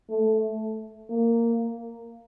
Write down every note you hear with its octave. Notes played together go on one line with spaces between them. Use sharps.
A3
A#3